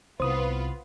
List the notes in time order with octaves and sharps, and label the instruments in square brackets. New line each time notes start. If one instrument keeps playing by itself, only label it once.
[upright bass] C2 [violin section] B3 F4 B4 [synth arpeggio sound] C5 D#6